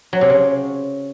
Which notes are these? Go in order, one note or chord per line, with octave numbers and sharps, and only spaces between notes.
F#3
C3
C#3